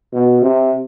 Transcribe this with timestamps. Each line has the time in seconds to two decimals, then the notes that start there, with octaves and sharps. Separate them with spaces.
0.13 B2
0.42 C3